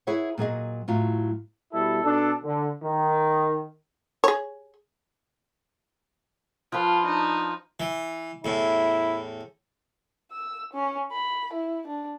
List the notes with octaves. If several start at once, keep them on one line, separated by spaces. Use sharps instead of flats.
E4 G#4 B4 C#5 E5 F#5
A#2 F#3 G#4 D#5
A2 F#3 F4
B2 G3 E4 A4
B2 D4 A4
D3
D#3
G#4 C#5
F3 F4 B4
D4 D#4
E3
E2 A2 E4
E6
C#4
B5
E4
D4